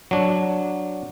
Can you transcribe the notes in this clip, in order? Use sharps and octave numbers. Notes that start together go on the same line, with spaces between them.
F#3 D4